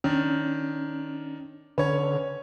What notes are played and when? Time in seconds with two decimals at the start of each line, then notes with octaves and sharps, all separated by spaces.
0.04 D#3 C#4 D4
1.78 D3 C#4 B4 C#5